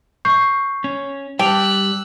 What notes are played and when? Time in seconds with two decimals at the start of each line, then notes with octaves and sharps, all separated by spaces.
0.25 C#6 G6 C7
0.84 C#4
1.39 G3 G5 A5 D6 E6 F#6 F7